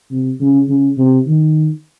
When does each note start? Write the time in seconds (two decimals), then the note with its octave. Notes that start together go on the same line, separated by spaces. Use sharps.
0.11 C3
0.40 C#3
0.68 C#3
0.98 C3
1.27 D#3